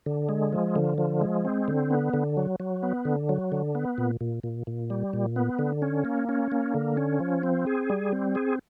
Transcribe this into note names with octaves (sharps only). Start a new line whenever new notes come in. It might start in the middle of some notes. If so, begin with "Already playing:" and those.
D3
G#3
F3
D3
F3
G#3
C4
D3
B3
D3
F#3
F#3
B3
D3
F#3
D3
B3
A#2
A#2
A#2
A#2
G3
A#2
B3
D3
C#4
A#3
C#4
A#3
D3
C#4
F3
C4
G#4
G3
C4
G#4